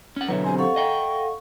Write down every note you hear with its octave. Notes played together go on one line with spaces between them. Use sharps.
C#4 F#5
B2 D3 F#3 B4 C#5 E5
C4 G4 C5 G#5
A4 F5 F#5 C#6
D#5 G5